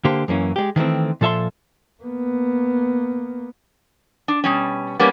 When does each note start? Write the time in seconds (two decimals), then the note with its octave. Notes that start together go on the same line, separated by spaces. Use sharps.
0.05 D3 A#3 G4 C5
0.28 F#2 E3 A#3 C#4
0.56 G#3 G4
0.76 D#3 E3 A3 C4
1.21 A#2 F3 A4 E5 A5 C6
2.03 A#3 B3
4.28 D4
4.44 B2 G3 C#4
4.99 G3 A#3 B3 C#4